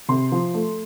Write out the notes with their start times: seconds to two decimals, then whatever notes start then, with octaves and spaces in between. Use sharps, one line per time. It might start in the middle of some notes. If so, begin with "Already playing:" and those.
0.09 C3 C6
0.32 F3
0.54 A3